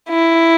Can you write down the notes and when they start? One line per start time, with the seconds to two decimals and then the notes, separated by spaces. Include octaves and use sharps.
0.10 E4